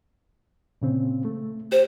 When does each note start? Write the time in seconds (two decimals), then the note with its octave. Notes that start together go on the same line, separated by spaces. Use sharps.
0.82 A#2 C#3 C4
1.25 A3
1.72 G4 C5